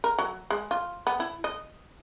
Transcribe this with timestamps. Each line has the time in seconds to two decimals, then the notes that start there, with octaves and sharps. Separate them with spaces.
0.04 A#4
0.18 F#3
0.50 G#3
0.71 F4
1.07 B3
1.20 E4
1.44 D#5